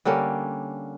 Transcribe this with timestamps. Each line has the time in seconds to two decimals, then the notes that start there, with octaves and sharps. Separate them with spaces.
0.05 D3 G3 A#3 C#4